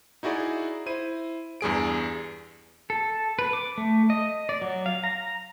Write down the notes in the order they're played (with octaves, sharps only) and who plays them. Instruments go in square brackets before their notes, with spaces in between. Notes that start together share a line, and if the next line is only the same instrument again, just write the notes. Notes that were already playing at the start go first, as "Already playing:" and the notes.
[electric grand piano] D#4 E4 F#4 G#4 D5
E4 C5 D#7
E2 G2 G#4 D7
[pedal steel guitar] A4
B4
D6
A3
D#5
D5
F#3
F5
A#5